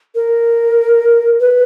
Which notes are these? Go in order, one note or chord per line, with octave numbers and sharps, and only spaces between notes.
A#4
B4